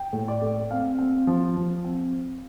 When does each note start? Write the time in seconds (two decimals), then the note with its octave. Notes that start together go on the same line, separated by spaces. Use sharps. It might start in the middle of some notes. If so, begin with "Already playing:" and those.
Already playing: G5
0.13 A2
0.28 D5
0.41 A3
0.71 C4 F5
0.99 C4
1.27 F3
1.57 F3
1.84 C4